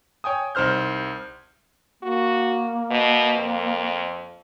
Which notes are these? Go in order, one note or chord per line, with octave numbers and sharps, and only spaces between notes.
C#5 G5 G#5 D#6
C2 D#4 C5 F6 G6
A#3 F#4
B2
F2